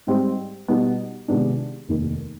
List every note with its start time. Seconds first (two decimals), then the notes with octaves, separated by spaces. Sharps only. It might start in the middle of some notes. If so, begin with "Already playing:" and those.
0.07 G#2 G3 C4
0.68 B2 G3 B3 D#4
1.28 C3 D#3 G#3 B3 D4
1.88 F1 D#2 D#3